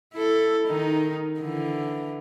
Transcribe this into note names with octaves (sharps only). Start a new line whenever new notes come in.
E4 A4
D#3 D#4
D3 E3